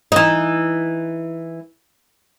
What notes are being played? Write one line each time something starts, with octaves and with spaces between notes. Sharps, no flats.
E3 D#4